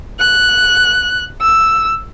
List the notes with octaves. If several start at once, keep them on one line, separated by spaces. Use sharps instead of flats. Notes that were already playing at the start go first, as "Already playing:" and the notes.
F#6
E6